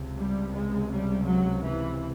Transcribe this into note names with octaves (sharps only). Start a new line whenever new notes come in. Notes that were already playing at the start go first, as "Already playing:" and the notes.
Already playing: C#2 C3
G3
G#3
G3
F#3
E3